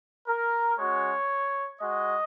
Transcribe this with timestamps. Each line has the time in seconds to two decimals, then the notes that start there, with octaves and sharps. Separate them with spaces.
0.27 A#4
0.78 G#3 C#4 F#4 C#5
1.80 G#3 F#4 D#5